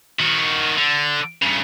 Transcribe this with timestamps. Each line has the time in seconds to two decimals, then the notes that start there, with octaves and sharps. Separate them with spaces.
0.19 D#3 F#4
0.78 D3
1.42 G2 C#3